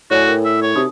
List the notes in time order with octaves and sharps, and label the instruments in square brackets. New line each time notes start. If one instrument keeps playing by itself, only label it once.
[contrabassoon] A2 [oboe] F#4 [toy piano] C#5 D5 G#5
[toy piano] A#4 G5
[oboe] E5
C#5
[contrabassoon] C3 [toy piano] D#4 F#4 D#6